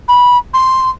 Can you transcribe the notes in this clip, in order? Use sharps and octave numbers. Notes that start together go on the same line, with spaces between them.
B5
C6